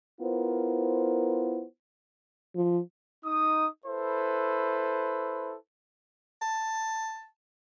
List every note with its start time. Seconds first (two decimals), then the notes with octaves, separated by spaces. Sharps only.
0.21 B3 E4 F4 A#4 C5
2.56 F3
3.25 D#4 D#6
3.86 E4 A4 B4 C5
6.42 A5